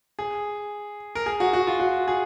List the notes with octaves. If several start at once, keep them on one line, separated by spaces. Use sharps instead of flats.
G#4
A#4
G#4
F#4
F#4
F4
F#4
G#4